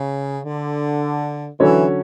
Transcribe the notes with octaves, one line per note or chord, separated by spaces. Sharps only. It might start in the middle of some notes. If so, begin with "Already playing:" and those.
Already playing: C#3
D3
D3 E3 F#3 C#4 F#4 C#5